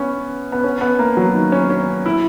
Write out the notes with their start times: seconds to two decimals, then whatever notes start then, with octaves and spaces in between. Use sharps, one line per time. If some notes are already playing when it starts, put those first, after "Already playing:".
Already playing: B3 C#4
0.52 B3
0.64 C#4
0.81 B3
0.99 A#3
1.17 F#3
1.34 D#3
1.52 C#4
1.70 C#4
2.06 E4